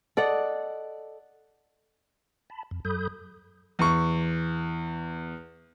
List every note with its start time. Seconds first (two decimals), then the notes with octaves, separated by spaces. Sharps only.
0.17 A4 D5 D#5 F#5
2.50 A5 B5
2.71 F2
2.85 F#2 F#3 A4 B5 D#6 G6
3.79 E2 C#6